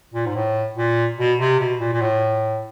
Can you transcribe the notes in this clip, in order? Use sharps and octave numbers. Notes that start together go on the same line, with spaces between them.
A#2
G#2
A2
A#2
B2
C3
B2
A#2
A#2
A2